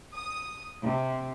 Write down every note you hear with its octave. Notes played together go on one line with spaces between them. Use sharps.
D#6
C3